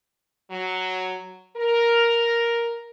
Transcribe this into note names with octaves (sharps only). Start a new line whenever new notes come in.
F#3
A#4